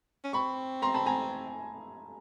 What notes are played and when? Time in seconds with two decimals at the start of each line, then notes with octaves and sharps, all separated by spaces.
0.24 C#4
0.33 C4 B5 C#6
0.82 A#5 C6
0.94 A5 B5
1.06 G#5 A#5